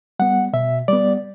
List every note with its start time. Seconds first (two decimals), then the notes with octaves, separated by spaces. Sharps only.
0.19 G3 B3 F#5
0.53 B2 E5
0.88 G3 B3 D5